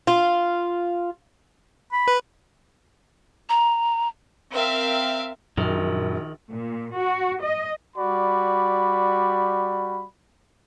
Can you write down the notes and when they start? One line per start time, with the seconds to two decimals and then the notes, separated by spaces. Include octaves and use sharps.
0.07 F4
1.92 B5
2.08 B4
3.49 A#5
4.52 C4 A#4 E5 F5
5.57 A#1 F#2 D#3 F#4 A#4
6.51 A#2
6.96 F#4
7.42 D#5
7.96 G3 F#4 D5 B5